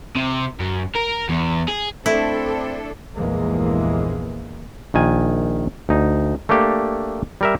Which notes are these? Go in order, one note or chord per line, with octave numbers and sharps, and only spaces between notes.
C3
F#2
A#4
E2
G#4
A3 C4 D4 E4 A4
A#1 E2 G2 E3 G#3 A#3
A#1 D#3 G#5
D2 D#4
A3 A#3 D4 G4 A4
G3 A#4 E5